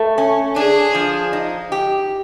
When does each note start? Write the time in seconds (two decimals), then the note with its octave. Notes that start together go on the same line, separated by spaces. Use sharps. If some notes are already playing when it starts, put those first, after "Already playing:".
Already playing: A3
0.18 C#4
0.56 D4 G#4
0.95 F3
1.33 D#4
1.72 G4